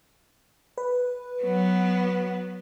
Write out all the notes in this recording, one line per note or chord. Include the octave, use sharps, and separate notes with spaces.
B4
F#3 B3